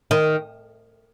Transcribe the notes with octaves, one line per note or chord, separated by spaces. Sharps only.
D#3